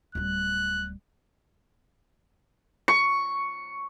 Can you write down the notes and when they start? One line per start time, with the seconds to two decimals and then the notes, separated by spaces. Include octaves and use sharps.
0.15 D1 G3 F#6
2.88 C#6